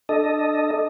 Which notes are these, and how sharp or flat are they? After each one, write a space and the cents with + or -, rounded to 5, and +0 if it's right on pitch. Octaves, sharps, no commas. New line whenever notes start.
D4 +20 A4 -5 D#5 +0